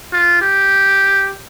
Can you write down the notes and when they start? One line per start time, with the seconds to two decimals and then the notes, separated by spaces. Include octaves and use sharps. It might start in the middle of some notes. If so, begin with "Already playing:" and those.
0.13 F4
0.42 G4